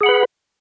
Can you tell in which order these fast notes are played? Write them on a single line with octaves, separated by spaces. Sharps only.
G#4 F#5 B5 B4